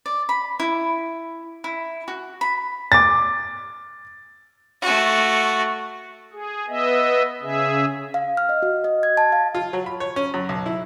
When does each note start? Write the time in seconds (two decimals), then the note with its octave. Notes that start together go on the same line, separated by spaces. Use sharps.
0.06 D5
0.29 B5
0.60 E4
1.64 E4
2.08 F#4
2.41 B5
2.92 D6 A6
4.82 A3 F#4
6.33 G#4
6.68 B3 D#5 E5
7.42 C#3 G#4 E5
8.14 F5
8.37 F6
8.49 D#5
8.62 F#4
8.84 D#5
9.03 G#6
9.17 A5
9.32 F5
9.55 F4
9.73 F#3
9.86 B5
10.00 C#5
10.16 C#4
10.34 F#2
10.49 B1
10.66 E4